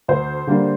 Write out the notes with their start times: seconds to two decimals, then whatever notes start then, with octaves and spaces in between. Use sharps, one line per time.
0.08 D2 C5
0.47 D3 G3 A#3 D4